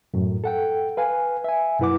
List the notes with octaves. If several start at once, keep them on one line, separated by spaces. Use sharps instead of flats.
F#2 A2
A4 F#5 G5
B4 F5 G#5
E5 G#5
F#2 A#2 E4 B4 F#5 D6